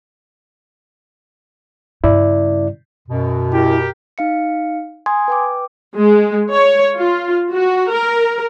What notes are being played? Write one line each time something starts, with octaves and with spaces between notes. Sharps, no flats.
G2 C#3 E4 D5
F#2 B2
E4 G4 A#4
D#4 F5 C#7
G#5 C6 D#6 G#6
B4 G5 D6
G#3
C#5
F4
F#4
A#4